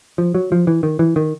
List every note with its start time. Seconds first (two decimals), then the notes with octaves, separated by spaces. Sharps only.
0.18 F3
0.35 F#3
0.52 F3
0.67 E3
0.83 D#3
0.99 E3
1.16 D#3